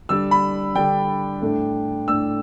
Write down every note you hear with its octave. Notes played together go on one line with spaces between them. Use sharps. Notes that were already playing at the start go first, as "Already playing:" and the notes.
D3 G3 D4 E6
B5
D3 G3 D4 G5
A2 A3 D4
A2 A3 D4 E6